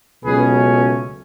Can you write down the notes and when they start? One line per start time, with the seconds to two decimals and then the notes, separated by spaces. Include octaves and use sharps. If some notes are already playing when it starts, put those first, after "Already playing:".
0.24 C#2 B2 F#3 A3 C#4 G#4 B4